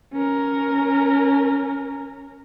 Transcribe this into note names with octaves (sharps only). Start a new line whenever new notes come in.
C#4 A#4